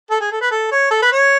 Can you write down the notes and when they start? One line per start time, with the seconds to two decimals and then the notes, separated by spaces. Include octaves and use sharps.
0.11 A4
0.21 G#4
0.31 A4
0.41 B4
0.51 A4
0.71 C#5
0.91 A4
1.02 B4
1.12 C#5